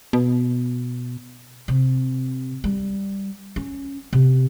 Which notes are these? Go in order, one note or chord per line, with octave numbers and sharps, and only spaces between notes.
B2
C3
G3
C#4
C3